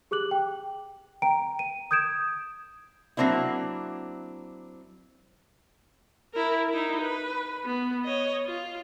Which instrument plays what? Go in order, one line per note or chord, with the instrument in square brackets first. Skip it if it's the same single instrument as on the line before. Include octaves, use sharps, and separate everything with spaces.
[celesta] G4 G#4 D6 F#6 F#7
G5
G5 A#5 D7
D#7
D#6 G6 G#6 D7 E7
[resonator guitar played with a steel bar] F#3 A#3 C4 D4 E4
[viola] E4 A#4
D#4 E4
B4
B3
C#5 D#5
F4